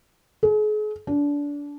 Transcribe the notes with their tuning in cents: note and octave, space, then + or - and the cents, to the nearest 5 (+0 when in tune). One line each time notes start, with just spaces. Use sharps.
G#4 +40
D4 -25